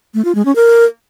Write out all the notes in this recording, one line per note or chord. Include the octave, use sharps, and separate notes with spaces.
A3
F4
G#3
C#4
A#4